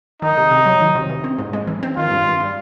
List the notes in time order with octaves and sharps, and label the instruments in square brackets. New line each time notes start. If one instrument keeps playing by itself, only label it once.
[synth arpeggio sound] D#3 [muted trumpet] D#4
[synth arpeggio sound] C3
C3
F#3
D#3
C3
E3
C4
G#2
G#3
E3
C4
[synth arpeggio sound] D#3 [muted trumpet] F4
[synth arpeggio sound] G2
G2
G3